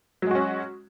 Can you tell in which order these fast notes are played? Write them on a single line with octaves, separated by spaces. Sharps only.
F#3 G#3 F#4 C#4